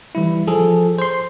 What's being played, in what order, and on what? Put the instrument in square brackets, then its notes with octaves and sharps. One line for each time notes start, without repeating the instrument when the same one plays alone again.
[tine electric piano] E3 G3 E4
F3 G#4 A4
C5 C6